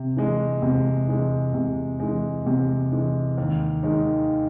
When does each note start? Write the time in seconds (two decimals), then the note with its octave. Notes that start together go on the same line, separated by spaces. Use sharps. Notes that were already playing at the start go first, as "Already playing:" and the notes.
Already playing: C3
0.17 E3 G#3
0.62 C3
1.09 E3 G#3
1.54 C3
2.00 E3 G#3
2.46 C3
2.92 E3 G#3
3.38 D#2
3.83 D#3 G#3